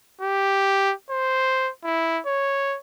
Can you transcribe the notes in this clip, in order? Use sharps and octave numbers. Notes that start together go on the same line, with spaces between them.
G4
C5
E4
C#5